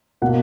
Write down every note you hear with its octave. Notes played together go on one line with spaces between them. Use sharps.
B2 A#3 F#5